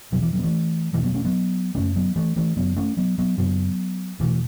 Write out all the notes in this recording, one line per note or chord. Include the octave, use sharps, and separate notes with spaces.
E2 B2 F#3
E3
F#3
B3
E3 A3
E2 B2 E3 A3
F#3 B3
A3 C#4
F#3 B3
F#2 C#3 A3 C#4
F#3 B3
E3 A3
E3 A3
F#2 C#3 F#3 B3
A3 C#4
F#3 B3
F#3 B3
F#2 C#3 F#3 B3
E2 B2 E3 A3